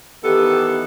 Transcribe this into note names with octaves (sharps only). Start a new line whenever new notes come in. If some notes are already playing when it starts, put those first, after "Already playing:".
D#3 E3 B3 G4 A4